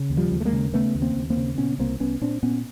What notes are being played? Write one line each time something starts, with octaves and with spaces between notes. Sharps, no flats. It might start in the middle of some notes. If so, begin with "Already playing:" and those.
Already playing: C#3
D#2
F3 G3
D#2
A3
G#3 A#3
C#3
C#3 A3 B3
D#2
A#3 C4
D#2
A#3 C4
C#3
A#2 B3 C#4
C2 A#3 C4
C2 B3 C#4
A#2 C4 D4
A#2 B3 C#4